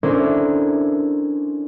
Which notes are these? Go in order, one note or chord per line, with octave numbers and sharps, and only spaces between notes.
C#4 D4 E4 A4 A#4 C5